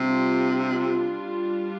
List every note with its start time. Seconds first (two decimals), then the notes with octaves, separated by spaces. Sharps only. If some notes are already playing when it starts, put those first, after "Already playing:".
Already playing: C3 G3 D4 F4